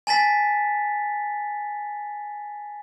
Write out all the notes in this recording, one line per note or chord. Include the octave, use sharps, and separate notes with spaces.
G#5 A5 A6 B6